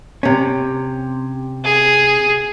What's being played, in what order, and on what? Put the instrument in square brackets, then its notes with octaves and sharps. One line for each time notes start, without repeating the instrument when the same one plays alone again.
[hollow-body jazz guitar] C3 C#4
[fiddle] G#4